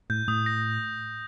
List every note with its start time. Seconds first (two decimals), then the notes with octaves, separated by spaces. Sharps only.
0.10 A2 G6
0.27 A2 D#6
0.46 A#6